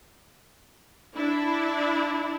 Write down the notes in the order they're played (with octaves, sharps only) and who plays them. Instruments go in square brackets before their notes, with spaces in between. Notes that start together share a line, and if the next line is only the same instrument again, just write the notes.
[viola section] D4 E4